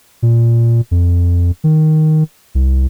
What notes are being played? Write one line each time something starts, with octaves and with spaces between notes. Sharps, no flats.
A#2
F2
D#3
C2